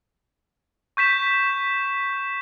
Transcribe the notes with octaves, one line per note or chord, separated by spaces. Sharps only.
C#6 G6 B6 E7